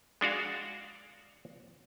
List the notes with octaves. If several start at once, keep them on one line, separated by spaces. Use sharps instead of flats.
G#3 D4 F#4 F5